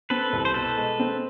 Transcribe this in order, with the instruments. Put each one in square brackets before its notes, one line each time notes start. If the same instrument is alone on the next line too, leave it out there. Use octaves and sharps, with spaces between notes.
[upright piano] C4 [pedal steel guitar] A4 B4
[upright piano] C2
[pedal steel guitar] C5
[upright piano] B2 [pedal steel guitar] A4 B4
[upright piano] G#3
C4